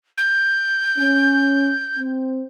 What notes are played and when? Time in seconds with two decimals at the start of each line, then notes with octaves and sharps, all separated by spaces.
0.18 G6
0.98 C#4
1.97 C4